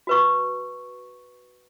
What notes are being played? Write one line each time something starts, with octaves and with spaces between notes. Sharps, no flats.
F#4 B4 C#6